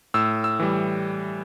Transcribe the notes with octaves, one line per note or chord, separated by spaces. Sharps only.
A2 E6
E6
E3 G3